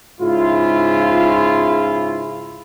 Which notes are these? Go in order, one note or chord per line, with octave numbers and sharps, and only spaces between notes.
G#2 C#3 E4 F4